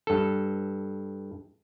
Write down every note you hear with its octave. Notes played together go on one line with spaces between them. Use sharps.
G2 A4